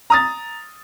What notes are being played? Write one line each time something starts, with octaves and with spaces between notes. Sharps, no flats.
A#5 D#6 A6